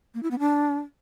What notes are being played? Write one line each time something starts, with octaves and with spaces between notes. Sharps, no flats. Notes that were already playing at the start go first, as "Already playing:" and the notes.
A#3
E4
B3
D4